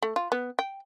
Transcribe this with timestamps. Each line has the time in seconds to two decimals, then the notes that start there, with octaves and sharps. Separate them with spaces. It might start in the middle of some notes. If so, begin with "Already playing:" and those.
0.03 A3
0.16 F4
0.32 B3
0.59 G5